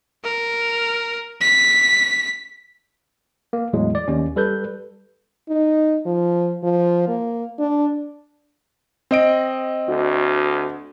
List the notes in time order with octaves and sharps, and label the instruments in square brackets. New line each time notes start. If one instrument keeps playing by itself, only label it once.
[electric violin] A#4
B6
[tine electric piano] A#3
E2 A2 F#3 G#3
D5
D#2 C#4
G3 A4 B4 G6
[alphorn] D#4
F3
F3
A#3
D4
[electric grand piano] C4 D#5 D7
[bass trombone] D2 [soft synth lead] F#4